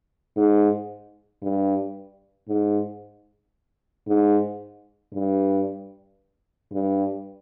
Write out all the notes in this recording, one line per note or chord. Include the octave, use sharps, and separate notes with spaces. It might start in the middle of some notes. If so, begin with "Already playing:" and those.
G#2
G2
G#2
G#2
G2
G2